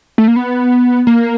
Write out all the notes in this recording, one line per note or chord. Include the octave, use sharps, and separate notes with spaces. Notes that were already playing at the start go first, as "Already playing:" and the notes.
A3
A#3
B3
A#3